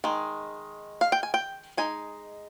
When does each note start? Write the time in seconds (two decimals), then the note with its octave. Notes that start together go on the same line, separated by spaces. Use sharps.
0.04 D#3 G#3
1.01 F5
1.12 G5
1.23 G#5
1.34 G5
1.77 G#3 D#4 G#5